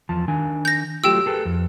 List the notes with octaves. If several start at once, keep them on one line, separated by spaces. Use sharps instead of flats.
E2 F3 A5
D#3 D4 G#5
G6 A#6
F#3 A3 F4 G4 G5 E6
G#4 A4 B4
F2